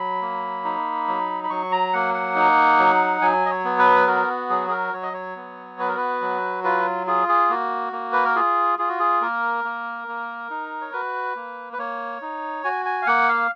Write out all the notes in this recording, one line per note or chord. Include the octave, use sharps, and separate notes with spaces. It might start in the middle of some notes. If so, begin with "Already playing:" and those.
Already playing: F#3 B5
A#3
D#4
F#3
B5
F#3 C#6
A#5
A#3 F#5
F#5
D#4
F#3
F#3 G#5
D#5
C#5
B3
B4
F#4 A#4
F#3 G#4
G#4
A#4
F#3 C#5
D#5
C#5
B3
F#4 B4
A#4
B4
F#3
F4 B4
F4 G#4
G#4
A#3 F#4
A#3
B4
A#4
F4 G#4
F4 G#4
F#4
G#4
A#3 A#4
A#3
A#3
D#4
C#5
F#4 B4
A#3
B4
A#3 C#5
D#4
F#4 G#5
G#5
F5
A#3 F#5
F5